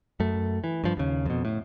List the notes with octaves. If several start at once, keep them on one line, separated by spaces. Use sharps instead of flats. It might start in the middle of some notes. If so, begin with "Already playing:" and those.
F#2 A3
E3
G2 F3
D#2 C#3
F2 B2
A2